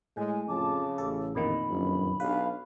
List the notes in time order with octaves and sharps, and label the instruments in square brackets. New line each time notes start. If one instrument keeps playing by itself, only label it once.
[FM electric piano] A2 [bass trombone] G#3 [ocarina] G#5
[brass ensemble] F2 F3 A5 [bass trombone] C#3 [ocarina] D6
[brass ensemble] A1 [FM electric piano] A4
[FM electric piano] F2 A#2 D#3 [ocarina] B5
[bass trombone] G1 [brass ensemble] F#2
[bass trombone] B1 [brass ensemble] D4 G4 F5 [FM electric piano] B4